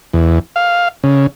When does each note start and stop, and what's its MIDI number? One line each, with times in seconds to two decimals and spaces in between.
0.13 0.39 40
0.56 0.88 77
1.04 1.27 49